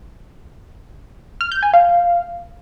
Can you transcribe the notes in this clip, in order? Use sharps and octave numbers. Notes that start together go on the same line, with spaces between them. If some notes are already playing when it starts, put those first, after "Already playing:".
F6
G6
G#5
F5